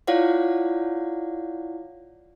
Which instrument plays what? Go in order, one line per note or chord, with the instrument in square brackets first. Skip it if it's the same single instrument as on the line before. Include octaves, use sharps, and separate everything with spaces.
[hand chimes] E4 F4 C#5 D5 F5 F#5